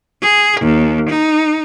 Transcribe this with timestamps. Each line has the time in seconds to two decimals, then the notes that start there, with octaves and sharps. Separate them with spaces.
0.22 G#4
0.61 D#2
1.10 D#4